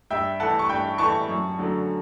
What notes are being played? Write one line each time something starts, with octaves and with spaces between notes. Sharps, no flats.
G2 E5 G5
E3 A3 F#5 A5
C#6
G2 G5 B5
E3 A3 A5 C#6
F#2
D3 F#3 A3